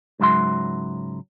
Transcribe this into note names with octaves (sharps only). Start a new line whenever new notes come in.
C#2 G#2 F#3 E5 C6